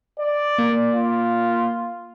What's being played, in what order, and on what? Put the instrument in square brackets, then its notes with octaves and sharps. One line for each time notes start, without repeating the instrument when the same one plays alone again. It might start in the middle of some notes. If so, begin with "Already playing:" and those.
[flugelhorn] D5
[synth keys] A#3
[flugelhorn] F4